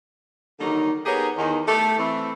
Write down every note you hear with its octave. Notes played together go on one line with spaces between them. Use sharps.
D3 D#3 F#3 G3 A#3 D#4
B3 D#4 G4 G#4 A#4 C#5
E2 D#3 D#4
A3 G4 A4
E3 A3 C4